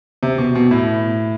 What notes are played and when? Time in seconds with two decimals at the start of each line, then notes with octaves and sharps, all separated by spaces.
0.23 C3
0.38 B2
0.55 B2
0.71 A2